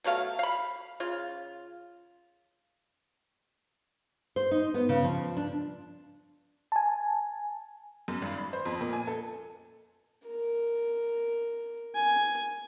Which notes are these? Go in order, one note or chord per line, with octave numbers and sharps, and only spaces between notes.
B2 F#3 A3 F5
F5 B5
C#3 F4
C5
D#4
B3
C#3
F3
D4
G#5 A5
F#2
G#1
B5
C5
F2
A#2
G#5
A4
A#4
G#5